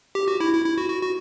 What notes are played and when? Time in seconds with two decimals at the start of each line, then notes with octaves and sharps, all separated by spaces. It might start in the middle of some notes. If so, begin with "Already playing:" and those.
0.15 G4
0.28 F#4
0.40 E4
0.53 E4
0.65 E4
0.78 F#4
0.90 F#4
1.02 F#4